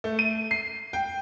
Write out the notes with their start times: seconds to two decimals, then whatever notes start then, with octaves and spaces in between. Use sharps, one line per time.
0.04 A3
0.19 D#7
0.51 C7
0.93 G5